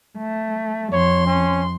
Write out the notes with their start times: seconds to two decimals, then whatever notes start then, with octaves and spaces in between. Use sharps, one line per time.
0.16 A3
0.92 F2 C#5 C6
1.27 C#4